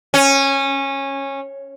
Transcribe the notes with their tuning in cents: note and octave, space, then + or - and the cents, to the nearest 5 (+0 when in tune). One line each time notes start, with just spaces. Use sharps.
C#4 -15